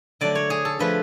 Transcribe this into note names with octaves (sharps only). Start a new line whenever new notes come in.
D3 F#3 A3 D4 D5
C#5
G#4
A4
D3 F3 A3 B4